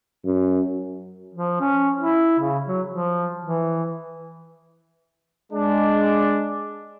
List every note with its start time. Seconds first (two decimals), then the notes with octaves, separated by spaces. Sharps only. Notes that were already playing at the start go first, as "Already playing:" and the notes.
0.25 F#2
1.34 F3
1.60 C#4
1.99 E4
2.39 C#3
2.67 F#3
2.89 F3
3.44 E3
5.53 G#3 D4